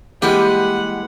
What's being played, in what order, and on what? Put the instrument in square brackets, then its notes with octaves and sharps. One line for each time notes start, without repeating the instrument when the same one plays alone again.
[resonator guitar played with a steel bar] E3 G3 G#3 [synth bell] A#3 [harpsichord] G4 [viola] F#5